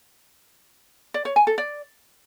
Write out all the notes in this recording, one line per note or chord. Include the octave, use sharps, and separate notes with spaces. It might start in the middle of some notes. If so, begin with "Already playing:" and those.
D5
C#5
G#5
A4
D5